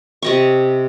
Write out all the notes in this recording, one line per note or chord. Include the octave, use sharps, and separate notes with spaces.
C3 D#5 C#6